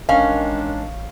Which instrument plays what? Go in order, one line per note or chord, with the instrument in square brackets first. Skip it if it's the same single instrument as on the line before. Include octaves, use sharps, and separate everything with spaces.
[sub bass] A1 [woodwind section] D#3 G#3 D4 [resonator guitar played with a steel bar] C#4 [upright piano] F5